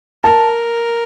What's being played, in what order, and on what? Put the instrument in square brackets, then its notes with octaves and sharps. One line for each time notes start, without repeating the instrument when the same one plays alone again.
[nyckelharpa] A#4 [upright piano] A5